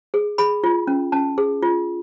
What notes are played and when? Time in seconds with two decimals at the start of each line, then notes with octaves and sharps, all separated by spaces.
0.14 G#4
0.38 G#4 B5
0.64 F4
0.87 C#4
1.12 C#4 A5
1.38 G#4
1.62 F4